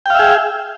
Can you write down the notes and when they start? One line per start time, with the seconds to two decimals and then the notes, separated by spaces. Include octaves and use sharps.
0.06 G5
0.10 F5
0.15 E5
0.19 G#4